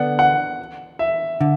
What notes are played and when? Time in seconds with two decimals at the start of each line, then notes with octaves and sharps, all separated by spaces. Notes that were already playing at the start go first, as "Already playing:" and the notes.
Already playing: D3 B3 D4 F#5
0.19 F#5
0.99 E5
1.41 D3